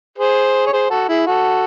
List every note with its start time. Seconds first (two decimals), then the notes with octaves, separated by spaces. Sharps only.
0.18 G#4 C5
0.67 C#5
0.72 G#4 C5
0.90 F#4 A4
1.09 E4 G#4
1.27 F#4 A4